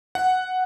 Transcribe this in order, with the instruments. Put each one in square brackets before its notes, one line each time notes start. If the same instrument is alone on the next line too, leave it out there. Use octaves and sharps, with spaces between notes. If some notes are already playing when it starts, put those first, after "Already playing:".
[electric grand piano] F#5